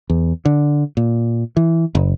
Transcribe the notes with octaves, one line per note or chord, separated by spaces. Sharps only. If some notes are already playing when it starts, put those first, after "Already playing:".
E2
D3
A#2
E3
F#1